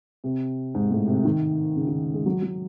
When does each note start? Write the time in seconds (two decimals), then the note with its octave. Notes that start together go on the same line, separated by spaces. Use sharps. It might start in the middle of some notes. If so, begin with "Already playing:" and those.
0.24 C3
0.75 G#2
0.91 A2
1.07 C3
1.25 D#3
1.76 C#3
1.88 D#3
2.14 G#3
2.26 F#3
2.42 F#3